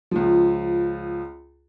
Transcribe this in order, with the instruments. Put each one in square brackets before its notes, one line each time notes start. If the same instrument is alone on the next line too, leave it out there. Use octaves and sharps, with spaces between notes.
[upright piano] C#2 F3